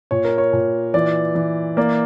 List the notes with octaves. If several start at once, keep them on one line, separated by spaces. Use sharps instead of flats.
A#2 C#5
A#4
C#5
A#2
E3 D5
E3
A#3 D5